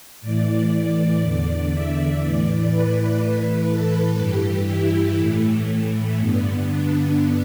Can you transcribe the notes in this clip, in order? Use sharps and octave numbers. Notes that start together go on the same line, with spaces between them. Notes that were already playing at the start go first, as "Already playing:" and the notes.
A2 E3 D5
E2 D3
E5
A2 E3 D5
B4
A2 E3
A4
G2 E3 G4
E4
A2 E3 A3
A3
G2 D3 B3
D4